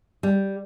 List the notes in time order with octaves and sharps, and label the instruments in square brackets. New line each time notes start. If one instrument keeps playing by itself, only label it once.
[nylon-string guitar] G3